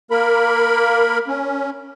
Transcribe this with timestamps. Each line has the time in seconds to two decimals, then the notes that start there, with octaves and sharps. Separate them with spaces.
0.11 A#3 A#4 B5
1.28 C#4